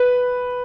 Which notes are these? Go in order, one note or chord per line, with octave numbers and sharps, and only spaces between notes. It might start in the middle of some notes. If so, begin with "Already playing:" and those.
Already playing: B4